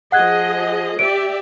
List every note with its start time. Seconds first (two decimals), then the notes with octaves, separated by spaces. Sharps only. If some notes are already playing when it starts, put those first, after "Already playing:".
0.12 F3 G#4 D#5 F#5 F#6 G#6
0.99 G4 D5 E5 D7